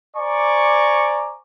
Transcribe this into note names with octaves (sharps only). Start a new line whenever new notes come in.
C5 D5 G#5 A#5 C#6 D6